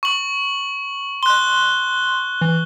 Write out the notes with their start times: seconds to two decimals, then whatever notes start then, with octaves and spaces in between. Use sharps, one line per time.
0.03 C#6 F#7
1.23 C6 F#6 G7
2.41 E3